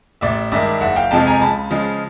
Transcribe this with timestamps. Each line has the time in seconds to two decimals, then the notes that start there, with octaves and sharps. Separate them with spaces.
0.21 A1 D5 E5
0.52 G2 D#3 G#3 D5 E5
0.81 F#1 E5 F#5
0.96 F5 G5
1.11 F2 C3 F3 G#3 G5 A5
1.27 G#5 A#5
1.41 C#2 A5 B5
1.70 C#3 F3 G#3